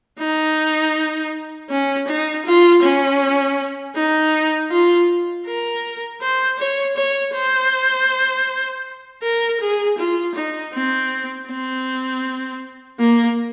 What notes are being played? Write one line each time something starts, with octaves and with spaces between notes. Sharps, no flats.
D#4
C#4
D#4
F4
C#4
D#4
F4
A#4
C5
C#5
C#5
C5
A#4
G#4
F4
D#4
C4
C4
A#3